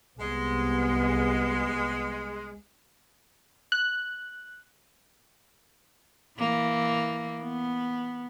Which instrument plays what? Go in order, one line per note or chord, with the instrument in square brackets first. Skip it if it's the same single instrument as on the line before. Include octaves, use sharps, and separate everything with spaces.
[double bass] C2 B3 [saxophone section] G#3
[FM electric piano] F#6
[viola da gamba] E3 A#3
B3